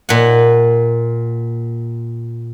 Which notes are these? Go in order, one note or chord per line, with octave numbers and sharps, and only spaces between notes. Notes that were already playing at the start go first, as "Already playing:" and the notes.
A#2 F#5